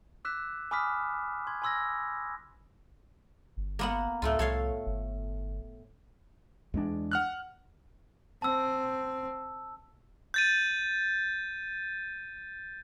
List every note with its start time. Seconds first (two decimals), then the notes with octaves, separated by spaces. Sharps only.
0.25 D6 E6 F#6 B6 E7
0.71 G#5 B5 D6 D#6 F6 B6
1.47 C6 G#6
1.62 G#5 B5 C6 E6 G#6 A#6
3.57 G1
3.79 A#3 B3 F#5
4.22 C#2 A2 A3 F4
4.39 C2 A4 C#5 F5
4.86 G1
6.74 E2 G#3 D4
7.11 F#5 F6 F#6
8.42 C4 A5 E6
10.34 G6 A6 D#7